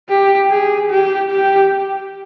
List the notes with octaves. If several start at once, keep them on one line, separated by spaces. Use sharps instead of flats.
G4
G#4
G4
G4